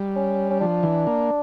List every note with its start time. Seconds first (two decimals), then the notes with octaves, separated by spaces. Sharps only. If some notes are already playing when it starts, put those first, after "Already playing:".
Already playing: G3
0.16 C#4
0.50 C#4
0.60 F3 D4
0.83 E3
1.07 A#3